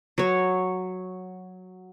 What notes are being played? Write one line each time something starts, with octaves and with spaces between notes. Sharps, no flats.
F#3 C#5